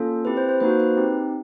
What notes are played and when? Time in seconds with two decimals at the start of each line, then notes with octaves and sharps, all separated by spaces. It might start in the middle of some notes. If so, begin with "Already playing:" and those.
Already playing: A#3 C#4 F4 A4
0.25 C4 E4 G4 B4
0.37 C5
0.49 C5
0.60 A#3 D#4 F#4 B4
0.70 C5
0.80 B4
0.97 C4 D#4 G4